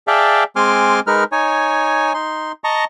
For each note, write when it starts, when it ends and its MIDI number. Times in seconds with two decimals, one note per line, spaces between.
0.07 0.44 68
0.07 0.44 74
0.07 0.44 76
0.07 0.44 77
0.07 0.44 79
0.07 0.44 81
0.56 1.00 56
0.56 1.00 60
0.56 1.00 80
0.56 1.00 84
0.56 1.00 86
0.56 1.00 89
1.07 1.24 56
1.07 1.24 63
1.07 1.24 70
1.07 1.24 71
1.07 1.24 89
1.32 2.13 63
1.32 2.13 73
1.32 2.13 80
2.14 2.52 63
2.14 2.52 84
2.64 2.84 75
2.64 2.84 81
2.64 2.84 82
2.64 2.84 85